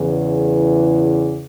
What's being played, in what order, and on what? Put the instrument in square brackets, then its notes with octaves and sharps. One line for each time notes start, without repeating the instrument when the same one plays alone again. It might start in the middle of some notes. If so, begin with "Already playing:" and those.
Already playing: [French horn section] E2 C#3 E3